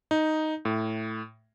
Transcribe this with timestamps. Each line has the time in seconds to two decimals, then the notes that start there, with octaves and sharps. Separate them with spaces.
0.11 D#4
0.65 A2